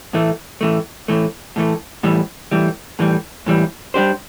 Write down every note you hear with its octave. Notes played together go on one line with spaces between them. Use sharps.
A2 E3 A3
A2 E3 A3
A2 E3 A3
A2 E3 A3
A2 E3 G3
A2 E3 G3
A2 E3 G3
A2 E3 G3
G3 D4 G4 C5